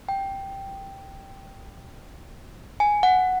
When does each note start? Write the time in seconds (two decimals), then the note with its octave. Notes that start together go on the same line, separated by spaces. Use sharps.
0.09 G5
2.80 G#5
3.03 F#5